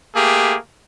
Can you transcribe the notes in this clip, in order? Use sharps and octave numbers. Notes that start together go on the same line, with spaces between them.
A3 A#3 G4 G#4